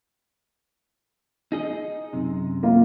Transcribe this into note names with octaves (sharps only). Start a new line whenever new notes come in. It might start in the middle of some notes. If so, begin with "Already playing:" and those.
D#4 G#4 D#5
F#2 C3
A#3 F4